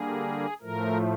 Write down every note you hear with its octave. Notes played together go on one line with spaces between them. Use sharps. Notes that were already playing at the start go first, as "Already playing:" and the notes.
Already playing: D3 G3 A#3 G#4
A2 F3 A3 A#4